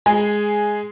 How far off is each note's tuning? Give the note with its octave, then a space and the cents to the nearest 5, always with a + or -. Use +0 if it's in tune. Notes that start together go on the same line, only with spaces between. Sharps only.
G#3 +0 G#4 +0